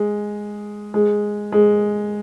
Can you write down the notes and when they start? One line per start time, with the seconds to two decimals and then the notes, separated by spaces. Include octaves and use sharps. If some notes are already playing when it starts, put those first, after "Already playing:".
Already playing: G#3
0.94 G#3
1.52 G#3